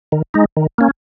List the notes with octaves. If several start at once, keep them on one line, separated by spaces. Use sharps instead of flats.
D#3
G#3 D#4
D#3
A#3 C#4